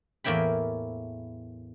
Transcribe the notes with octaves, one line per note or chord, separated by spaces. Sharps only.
E2 A2 A#3 E4 G5 B5